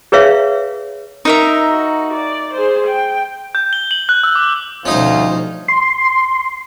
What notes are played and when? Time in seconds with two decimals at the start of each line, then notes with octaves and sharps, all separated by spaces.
0.12 G#4 B4 C#5 E5 F5
1.25 D#4 A#4 E5
1.70 F#4
2.14 D5
2.54 G#4 C5
2.87 G5
3.55 G6
3.73 G7
3.91 F#7
4.09 F#6
4.23 E6
4.35 D6
4.85 D2 B2 F3 G3 C#4 D#4 F4 C5
5.68 C6